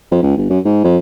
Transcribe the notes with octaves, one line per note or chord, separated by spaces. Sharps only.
F2
C#2
G1
F#2
G#2
F2